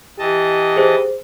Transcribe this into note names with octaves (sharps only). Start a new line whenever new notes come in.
E3 G4 D#5 A5
G#4 C5